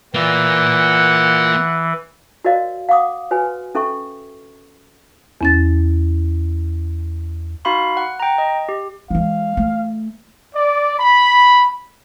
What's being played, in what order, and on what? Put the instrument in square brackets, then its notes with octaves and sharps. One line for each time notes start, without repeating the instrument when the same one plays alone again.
[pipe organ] E3 [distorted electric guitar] A#3 F4 [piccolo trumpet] F#5
[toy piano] F#4 A#4 C5 D5 D#5 F5
F5 F#5 D6 D#6
F#4 B4 C#5 G#5
C#4 A4 E5 C#6
[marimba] E2 C#4 A6
[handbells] D#4 F#4 F5 B5 C6
F#5
G5 A#5
D#5
G4
[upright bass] E3 G#3 [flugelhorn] F5
[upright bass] A3
[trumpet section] D5
B5